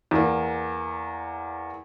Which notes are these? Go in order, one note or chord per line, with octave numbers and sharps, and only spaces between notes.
E2 A#3